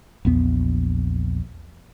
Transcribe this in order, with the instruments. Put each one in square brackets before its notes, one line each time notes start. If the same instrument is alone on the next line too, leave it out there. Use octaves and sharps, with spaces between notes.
[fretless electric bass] A#1 E2 B3